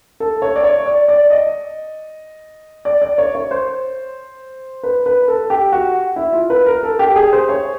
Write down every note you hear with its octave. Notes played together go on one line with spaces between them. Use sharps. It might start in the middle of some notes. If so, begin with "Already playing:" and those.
A4
C#5
D5
C#5
D5
D5
D#5
D5
D5
C#5
C#5
C5
B4
B4
A4
G4
F#4
E4
F4
B4
A#4
A4
G4
G#4
C5
C#5